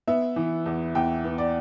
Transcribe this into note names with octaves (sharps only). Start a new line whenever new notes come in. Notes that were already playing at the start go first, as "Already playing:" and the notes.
B3 E5
E3
E2
E2 G5
B3
D5